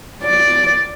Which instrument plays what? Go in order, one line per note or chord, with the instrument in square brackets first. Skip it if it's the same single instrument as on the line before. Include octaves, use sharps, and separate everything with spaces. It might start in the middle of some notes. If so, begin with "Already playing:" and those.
[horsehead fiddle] D5